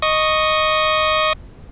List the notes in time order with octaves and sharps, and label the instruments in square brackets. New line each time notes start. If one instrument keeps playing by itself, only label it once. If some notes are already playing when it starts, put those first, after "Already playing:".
[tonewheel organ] D#5 C#6 D#6